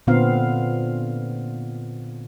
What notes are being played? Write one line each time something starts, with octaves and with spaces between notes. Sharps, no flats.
A#2 D3 B3 C4 F4 F5